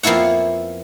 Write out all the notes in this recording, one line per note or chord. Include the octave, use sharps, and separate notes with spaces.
F2 F3 A#3 B3 E4 F#5